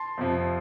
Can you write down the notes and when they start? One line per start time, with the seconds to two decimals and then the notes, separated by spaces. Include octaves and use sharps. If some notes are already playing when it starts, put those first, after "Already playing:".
Already playing: A5 C6
0.18 F2 C3 F3